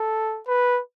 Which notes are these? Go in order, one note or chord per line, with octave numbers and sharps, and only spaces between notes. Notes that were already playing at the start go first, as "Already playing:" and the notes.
Already playing: A4
B4